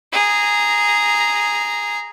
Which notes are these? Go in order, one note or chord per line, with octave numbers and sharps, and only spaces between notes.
G#4 A#5